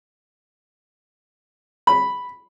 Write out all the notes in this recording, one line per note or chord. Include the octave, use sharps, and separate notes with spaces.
B5